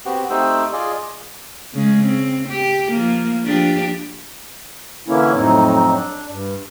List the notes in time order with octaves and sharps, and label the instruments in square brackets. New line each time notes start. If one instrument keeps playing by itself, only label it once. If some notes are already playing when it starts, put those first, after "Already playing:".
[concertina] B3 C4 F#4 G4
A3 C4 D#4 G4 C5 E6
F4 G#4 D5 D#5
[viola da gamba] C#3 G#3
C4
G4
F3 A#3
F3 D4 G4
[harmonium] D3 E3 A#3 C#4 E4
F2 A2 F#3 C4 D#4
D4
G2